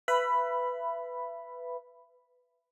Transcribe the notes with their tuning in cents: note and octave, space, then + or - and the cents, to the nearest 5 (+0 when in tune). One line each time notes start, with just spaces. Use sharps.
B4 +10 E5 +30 B5 +0